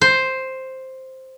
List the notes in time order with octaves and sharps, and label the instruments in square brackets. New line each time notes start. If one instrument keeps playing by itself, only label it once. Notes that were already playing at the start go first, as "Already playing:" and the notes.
[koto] C5